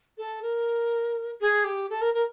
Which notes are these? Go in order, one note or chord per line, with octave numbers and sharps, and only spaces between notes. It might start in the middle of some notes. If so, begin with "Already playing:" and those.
A4
A#4
G#4
G4
A4
A#4
A#4